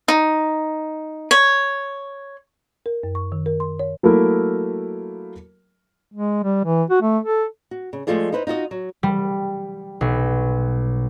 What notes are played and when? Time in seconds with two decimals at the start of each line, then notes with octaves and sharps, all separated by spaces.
0.08 D#4
1.31 C#5
2.86 A#4
3.03 F#2
3.15 C#6
3.32 D#3
3.46 A#4
3.60 C6
3.79 C#5
4.03 F#3 A3 A#3 E4 A#4
6.13 G#3
6.43 G3
6.65 E3
6.90 F#4
7.02 A3
7.23 A4
7.71 F#4
7.93 C#3
8.07 F3 G#3 A3 F4 G#4 D5
8.32 D#4 E4 B4 C5
8.47 D#4 F4 F#4 D#5
8.71 F#3
9.03 G3
10.01 B1